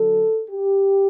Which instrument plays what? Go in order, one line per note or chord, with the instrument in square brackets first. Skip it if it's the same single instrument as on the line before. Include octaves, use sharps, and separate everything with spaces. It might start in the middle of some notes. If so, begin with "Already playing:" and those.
Already playing: [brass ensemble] D3 F#3 A4
G4